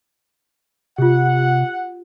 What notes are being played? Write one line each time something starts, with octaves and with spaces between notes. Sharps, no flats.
C3 F4 G4 F#5